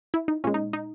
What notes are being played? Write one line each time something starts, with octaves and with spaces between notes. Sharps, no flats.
E4
D#4
A#2 G#3 C#4
D#4
D#4